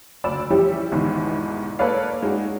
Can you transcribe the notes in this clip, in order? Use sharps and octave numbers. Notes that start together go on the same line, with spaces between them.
F#1 D2 D5 E6 E7
E3 F3 G3 C#4 E4 G4
G1 E2 G#2 B2 D#3 E3
A#3 A4 B4 C#5 D5 F5
G#3 C#4 D#4 F#4